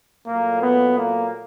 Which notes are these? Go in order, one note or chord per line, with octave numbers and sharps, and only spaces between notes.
A#2 F#3 A3 A#3
B3
A#3